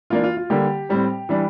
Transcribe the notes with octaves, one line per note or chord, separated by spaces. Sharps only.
E3 A#3 D4 F4
F4
F4
D3 G3 A#3 G4
A2 G3 C4
E3 G3 D4